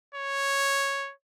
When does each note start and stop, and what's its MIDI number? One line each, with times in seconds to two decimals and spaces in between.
0.15 1.12 73